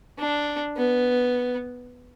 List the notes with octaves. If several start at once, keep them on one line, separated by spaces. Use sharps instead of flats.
D4
B3